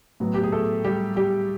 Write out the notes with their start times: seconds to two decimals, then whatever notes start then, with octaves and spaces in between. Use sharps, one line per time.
0.20 A2 F#3 B3
0.34 G4
0.44 G#4
0.52 A3 A4
0.85 G3 G4
1.16 G3 G4